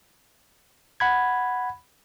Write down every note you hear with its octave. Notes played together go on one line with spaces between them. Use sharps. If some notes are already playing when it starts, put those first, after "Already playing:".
F#5 B5 G#6